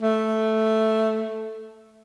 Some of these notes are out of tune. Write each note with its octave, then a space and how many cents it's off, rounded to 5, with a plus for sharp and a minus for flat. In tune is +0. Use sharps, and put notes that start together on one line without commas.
A3 +0